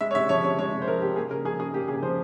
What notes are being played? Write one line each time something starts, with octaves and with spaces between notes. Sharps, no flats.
G#3 E5
C#5
C3 E5
F3 C#5
C3 C#5
G#3 C#5
C3
C5
F3 A#4
C3 G4
A#3 G#4
C#3 A#4
F3 G#4
C#3 G#4
A#3 G4
C#3 G#4
F3 C5